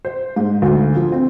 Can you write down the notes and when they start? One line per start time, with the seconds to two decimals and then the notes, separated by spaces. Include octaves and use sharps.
0.05 C5
0.36 G#2
0.62 D2
0.96 F3
1.12 C4